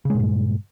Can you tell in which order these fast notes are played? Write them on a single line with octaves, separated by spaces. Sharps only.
C#3 G#3 A#2 G2